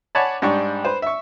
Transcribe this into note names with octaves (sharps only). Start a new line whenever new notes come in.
C#5 D5 F#5 G#5 A5 B5
G#2 G3 D4 G5 C#6
B4 C5
E5 C#6